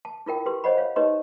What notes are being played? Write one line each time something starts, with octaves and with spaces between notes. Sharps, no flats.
A5
E4 F4 A#4 G5
G4 B4 C6
C5 C#5 D#5 F#5 B5
C#5 F5
D#4 G4 B4 C#5 D#5 C6